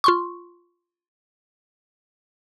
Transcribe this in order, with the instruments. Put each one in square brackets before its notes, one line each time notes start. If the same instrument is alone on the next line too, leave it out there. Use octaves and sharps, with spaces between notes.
[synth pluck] F4 C6 C#6